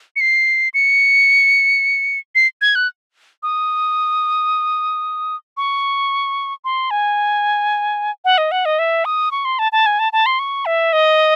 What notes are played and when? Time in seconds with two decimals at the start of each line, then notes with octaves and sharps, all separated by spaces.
0.16 C#7
0.21 C7
0.74 C#7
2.35 C7
2.61 G#6
2.75 F#6
3.43 D#6
5.57 C#6
6.65 C6
6.91 G#5
8.25 F#5
8.38 D#5
8.52 F#5
8.65 D#5
8.79 E5
9.05 D#6
9.31 C#6
9.45 C6
9.59 A5
9.72 A5
9.86 G#5
9.99 A5
10.13 A5
10.26 C6
10.39 C#6
10.66 E5
10.93 D#5